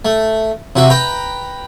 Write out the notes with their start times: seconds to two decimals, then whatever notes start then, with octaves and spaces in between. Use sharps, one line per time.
0.05 A3
0.76 C3 F#4 E5
0.90 B4 G5 A#5